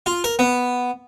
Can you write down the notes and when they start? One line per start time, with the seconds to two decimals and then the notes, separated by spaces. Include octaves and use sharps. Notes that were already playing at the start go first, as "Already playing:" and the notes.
0.06 F4
0.24 A#4
0.39 B3